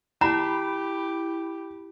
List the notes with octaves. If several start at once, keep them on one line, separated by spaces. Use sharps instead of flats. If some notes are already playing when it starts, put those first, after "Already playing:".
E4 G4 A#5 B5